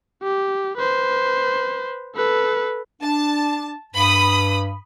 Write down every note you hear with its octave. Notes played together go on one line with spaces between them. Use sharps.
G4
B4 C5
A4 B4
D4 A5
G2 B5 D#6